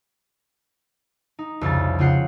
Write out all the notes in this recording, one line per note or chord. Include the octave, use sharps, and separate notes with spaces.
D#4
C2 F2 C#3 A6
C#3 C4 F4 F#5 C7